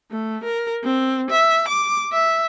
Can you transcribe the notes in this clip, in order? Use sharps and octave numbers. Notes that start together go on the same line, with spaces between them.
A3
A#4
C4
E5
D6
E5